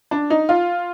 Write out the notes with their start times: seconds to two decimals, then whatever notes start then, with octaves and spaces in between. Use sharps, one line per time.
0.11 D4
0.30 D#4
0.49 F4